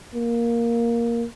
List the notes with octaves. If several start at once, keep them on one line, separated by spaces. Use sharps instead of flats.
A#3